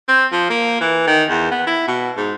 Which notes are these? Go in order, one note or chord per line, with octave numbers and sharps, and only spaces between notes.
C4
F3
A#3
E3
D#3
E2
B3
E4
B2
G#2